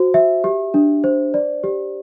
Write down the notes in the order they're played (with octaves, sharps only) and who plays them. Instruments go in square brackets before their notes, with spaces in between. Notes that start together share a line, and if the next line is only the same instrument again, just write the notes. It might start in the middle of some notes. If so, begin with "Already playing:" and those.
Already playing: [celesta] F#4 C5
E5
G4
D4
C5
D5
G4